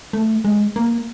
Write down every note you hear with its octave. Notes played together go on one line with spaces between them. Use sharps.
A3
G#3
A#3